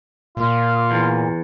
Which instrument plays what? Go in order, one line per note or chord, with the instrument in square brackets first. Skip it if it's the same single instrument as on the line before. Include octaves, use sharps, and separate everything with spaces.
[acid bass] A#2 [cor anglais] F4
[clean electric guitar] E2